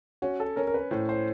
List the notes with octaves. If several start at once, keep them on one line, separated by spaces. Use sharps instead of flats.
C#4 F#4
A4
C#4 A#4
A#4
B4
A2 C5
C5